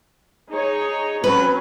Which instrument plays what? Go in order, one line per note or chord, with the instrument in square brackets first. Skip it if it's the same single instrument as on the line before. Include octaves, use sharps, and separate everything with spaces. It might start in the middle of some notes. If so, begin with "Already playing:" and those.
[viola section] D#4 G#4 C#5
[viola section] F#3 C4 C#4 [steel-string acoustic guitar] B4